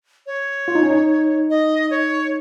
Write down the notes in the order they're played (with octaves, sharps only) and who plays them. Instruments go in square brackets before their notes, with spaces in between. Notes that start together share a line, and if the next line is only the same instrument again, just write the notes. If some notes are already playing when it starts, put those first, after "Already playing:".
[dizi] C#5
[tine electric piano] F4
D#4
C#4
D#4
[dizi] D#5
C#5